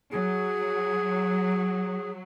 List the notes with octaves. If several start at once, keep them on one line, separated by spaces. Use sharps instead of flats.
F#3 G#4